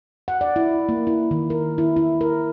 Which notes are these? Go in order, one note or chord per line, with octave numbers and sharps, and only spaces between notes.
F#5
D5
E4
A#3
E4
D#3
A#4
E4
E4
A#4